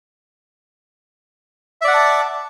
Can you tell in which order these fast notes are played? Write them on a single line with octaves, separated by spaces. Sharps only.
E5 D5 F#5 D6 A5